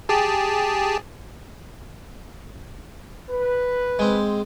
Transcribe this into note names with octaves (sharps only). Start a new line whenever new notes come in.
G4 G#4 A5
B4
G#3 C4